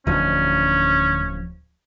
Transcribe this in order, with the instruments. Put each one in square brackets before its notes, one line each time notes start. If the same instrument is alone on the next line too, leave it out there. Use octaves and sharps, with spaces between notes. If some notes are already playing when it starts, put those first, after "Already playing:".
[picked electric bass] D1 F3 [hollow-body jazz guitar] D2 D#4 [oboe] C#4